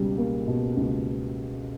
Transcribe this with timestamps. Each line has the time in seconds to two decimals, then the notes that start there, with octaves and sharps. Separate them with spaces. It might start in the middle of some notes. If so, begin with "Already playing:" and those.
Already playing: C#2 B2 G3
0.17 A#3
0.47 B2
0.77 C#2